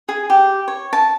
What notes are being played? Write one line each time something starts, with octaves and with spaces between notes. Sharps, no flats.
G#4
G4
C#5
A5